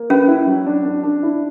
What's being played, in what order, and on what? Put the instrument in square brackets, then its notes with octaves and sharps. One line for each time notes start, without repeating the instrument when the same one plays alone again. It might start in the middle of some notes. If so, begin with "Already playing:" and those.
Already playing: [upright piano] A#3
[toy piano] C#4 [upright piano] B4
[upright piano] E4
F#3
D4
D4
D4
E4